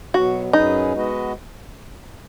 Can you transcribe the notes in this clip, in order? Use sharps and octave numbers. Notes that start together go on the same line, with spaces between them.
B2 F#3 B3 F#4
F#2 F#3 C#4 D#4 G#4 B4
G#3 B3 F#4 B4 D#5